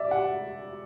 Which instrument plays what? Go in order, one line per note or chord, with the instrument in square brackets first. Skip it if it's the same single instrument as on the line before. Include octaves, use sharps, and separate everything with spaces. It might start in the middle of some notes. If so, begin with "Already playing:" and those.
Already playing: [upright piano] D5 E5
F#5